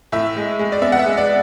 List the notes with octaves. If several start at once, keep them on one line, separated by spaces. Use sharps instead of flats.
A2 E5
G#3
G#3
D5
B3 E5
F#5
E5
G#3
D5